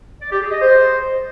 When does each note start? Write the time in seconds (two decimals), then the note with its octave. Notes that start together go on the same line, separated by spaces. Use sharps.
0.21 D5
0.31 G4
0.41 G#4
0.51 D#5
0.62 C5